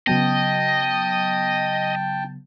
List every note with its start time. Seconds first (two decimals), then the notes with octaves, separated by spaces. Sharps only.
0.07 C#3 F#3 B3 D#5 G5 A5